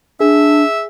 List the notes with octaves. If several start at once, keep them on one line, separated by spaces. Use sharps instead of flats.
D4 G#4 E5